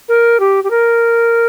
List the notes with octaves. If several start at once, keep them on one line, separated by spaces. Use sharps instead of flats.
A#4
G4
G4
A#4